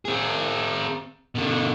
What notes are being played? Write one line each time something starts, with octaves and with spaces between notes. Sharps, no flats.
C4 G#4
B2 D3